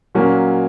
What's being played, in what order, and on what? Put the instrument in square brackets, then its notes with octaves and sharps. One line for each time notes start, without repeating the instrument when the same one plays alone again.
[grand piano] A#2 F#3 A#3 C#4 F#4